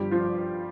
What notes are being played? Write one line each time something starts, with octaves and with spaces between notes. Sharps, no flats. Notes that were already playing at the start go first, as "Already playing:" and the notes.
Already playing: G1 G2 F3 G3 G4
F3 F4